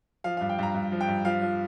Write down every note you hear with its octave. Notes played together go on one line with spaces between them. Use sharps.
F3 F5
G2 F5
G5
G2 A#5
G2
F3
G5
G2
F3 F5
F3